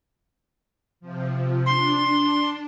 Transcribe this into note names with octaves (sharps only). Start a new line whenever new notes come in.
C3 F3
D4 C6